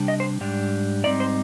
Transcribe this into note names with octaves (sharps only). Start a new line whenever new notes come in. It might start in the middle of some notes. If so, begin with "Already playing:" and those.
Already playing: C3 G3 D4
D#5
C5
G#2 G3 D4
G#2 G3 C4 D#4 D5
C5